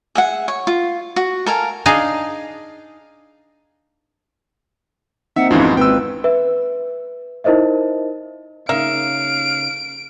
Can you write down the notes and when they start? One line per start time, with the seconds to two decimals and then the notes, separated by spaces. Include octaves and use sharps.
0.15 G#4 E5 F#5
0.48 C#5
0.67 F4
1.16 F#4
1.46 A4 A#4 F5 G#5
1.86 D4 D#4 G#4 D#5 F5 G#5
5.36 A#3 C4 D#4 E5 F#5
5.51 G#1 F2 G#2 E3 C#4 D#4 F4 F#4
5.77 G#1 B4 G5 E6
6.24 B4 E5
7.44 D#4 E4 A#4 C5 D#5 E5
8.69 C#3 A#3 D#4 E5 F5 D7